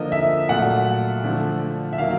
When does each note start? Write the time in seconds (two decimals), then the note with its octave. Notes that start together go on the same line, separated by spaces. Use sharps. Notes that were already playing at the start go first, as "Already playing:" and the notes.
Already playing: D3 F3 A#3 D#5
0.12 E5
0.49 A#2 F#3 A3 F#5
1.24 D3 F3 A3
1.93 E5
1.98 D#3 F#3 A#3 F5